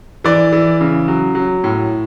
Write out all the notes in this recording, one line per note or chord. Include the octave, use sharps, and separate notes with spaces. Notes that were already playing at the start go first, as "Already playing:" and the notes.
E3 D5
E3
C#3
F#3
F#3
A2